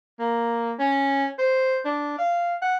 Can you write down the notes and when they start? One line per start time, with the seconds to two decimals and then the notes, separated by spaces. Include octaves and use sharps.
0.19 A#3
0.79 C#4
1.39 C5
1.85 D4
2.19 F5
2.62 F#5